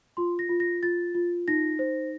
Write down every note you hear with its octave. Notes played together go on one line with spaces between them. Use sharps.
F4 C6
A#6
F4
A#6
F4 A6
F4
D#4 A#6
C5